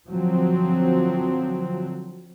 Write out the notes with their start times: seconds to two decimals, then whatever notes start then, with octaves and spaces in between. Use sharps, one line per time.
0.11 D3 F3 F#3 C4